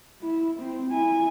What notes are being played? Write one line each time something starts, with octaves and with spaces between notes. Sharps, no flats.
E4
C4
E4 G#5